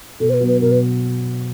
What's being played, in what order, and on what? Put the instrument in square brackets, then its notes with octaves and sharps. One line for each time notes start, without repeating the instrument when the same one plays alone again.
[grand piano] B2 [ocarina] A4
[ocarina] C5
B4
[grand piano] F#3 B3
[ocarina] B4
[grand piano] B2 [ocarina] A#4
[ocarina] B4